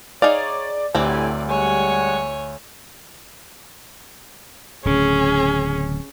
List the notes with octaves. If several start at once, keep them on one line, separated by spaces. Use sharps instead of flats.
D#4 G#4 C#5 D5 F5
D2 A2 E3 F#3 C4 G4 D5 G#5
G3 G#3 C#5 F#5 G#5
D1 C#3 C#4 G#4